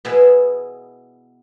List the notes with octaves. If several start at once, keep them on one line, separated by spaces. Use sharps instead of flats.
B2 B3 E4 G#4 E5